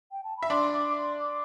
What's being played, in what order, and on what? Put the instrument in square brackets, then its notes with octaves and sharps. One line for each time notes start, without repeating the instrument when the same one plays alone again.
[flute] G5
A5
B5
[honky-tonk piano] E5
[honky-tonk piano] D4 D5 [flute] C6
[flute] D6
D6
C6
D6